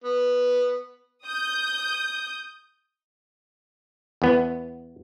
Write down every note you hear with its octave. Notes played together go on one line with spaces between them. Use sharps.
B3
D#6 G6
E2 B3